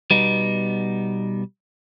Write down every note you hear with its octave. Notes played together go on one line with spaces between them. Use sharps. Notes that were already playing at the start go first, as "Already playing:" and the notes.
B2 G3 B3 D#4